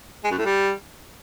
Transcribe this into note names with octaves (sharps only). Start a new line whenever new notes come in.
G#3
F#2
A2
G3